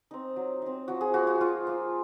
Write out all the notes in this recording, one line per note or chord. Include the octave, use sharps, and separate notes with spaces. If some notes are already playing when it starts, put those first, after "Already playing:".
C4 D#4
F#3
C4 D#4
F3 F#4
G#4
A#3 F4 F#4
F#4
F3 F4
A#3 F4